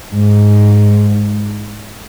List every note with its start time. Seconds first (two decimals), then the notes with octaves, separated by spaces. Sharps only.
0.12 G#2